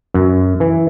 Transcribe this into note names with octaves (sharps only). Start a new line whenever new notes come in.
F#2
E3